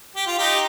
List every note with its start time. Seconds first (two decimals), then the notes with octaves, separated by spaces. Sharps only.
0.16 G4
0.27 F4
0.38 D#4 G4